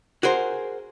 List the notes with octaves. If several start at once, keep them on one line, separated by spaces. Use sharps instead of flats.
F#4 G#4 A#4 C5